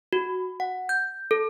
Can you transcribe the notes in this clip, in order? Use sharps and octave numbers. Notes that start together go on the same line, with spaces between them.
F#4
F#5
G6
A4